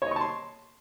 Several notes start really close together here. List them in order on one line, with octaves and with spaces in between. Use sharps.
C#5 D#5 C#6 A5 C6